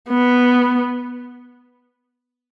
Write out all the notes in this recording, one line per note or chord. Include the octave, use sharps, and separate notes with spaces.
B3